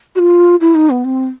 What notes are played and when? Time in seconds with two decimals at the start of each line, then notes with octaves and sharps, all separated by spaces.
0.16 F#4
0.19 F4
0.61 E4
0.75 D#4
0.90 B3
1.05 C4